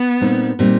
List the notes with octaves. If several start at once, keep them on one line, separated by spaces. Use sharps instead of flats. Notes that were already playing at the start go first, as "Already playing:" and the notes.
Already playing: B3
A#2 G3 C4 D#4
A#2 G3 C4 D#4